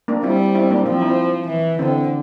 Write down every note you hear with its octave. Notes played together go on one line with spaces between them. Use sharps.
A#3 D4
G3 C4 E4
C4 E4
A#3 D4
F3 C4
C4 E4
E3
D3 C4 E4